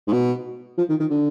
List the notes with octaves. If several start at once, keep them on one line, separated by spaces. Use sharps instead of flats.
G#2
B2
F3
D#3
D#3
D3